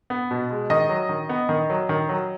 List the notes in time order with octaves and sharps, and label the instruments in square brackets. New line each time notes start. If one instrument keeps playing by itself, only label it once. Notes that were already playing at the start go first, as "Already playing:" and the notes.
[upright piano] B3
B2
G#3
D#3 D#5
F#3
D#3
B3
D#3
F#3
D#3
F#3